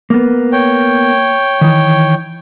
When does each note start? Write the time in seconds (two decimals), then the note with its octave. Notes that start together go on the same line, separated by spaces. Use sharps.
0.10 A#3 B3
0.52 C#5 G5
1.61 D#3 E3